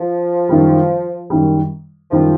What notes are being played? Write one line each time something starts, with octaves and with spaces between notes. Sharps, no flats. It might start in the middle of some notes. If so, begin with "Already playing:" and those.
Already playing: F3
F#2 D#3 G3
F#2 D#3 G3
F#2 D#3 F3 G3